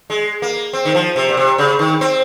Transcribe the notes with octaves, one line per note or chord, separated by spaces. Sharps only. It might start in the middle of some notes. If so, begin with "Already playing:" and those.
G#3
A#3
C4
D#3
F3
C3
A#2
C3
C#3
D#3
C4